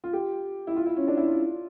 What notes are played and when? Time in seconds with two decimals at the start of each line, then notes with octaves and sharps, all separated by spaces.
0.04 F4
0.13 G4
0.67 E4
0.76 F4
0.86 E4
0.96 C#4
1.08 D4
1.17 E4
1.28 F4